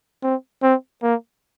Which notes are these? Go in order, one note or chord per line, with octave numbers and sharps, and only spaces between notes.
C4
C4
A#3